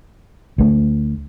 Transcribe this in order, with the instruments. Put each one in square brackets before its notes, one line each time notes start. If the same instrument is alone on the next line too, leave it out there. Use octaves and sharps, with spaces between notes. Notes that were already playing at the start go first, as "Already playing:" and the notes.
[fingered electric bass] D2 A3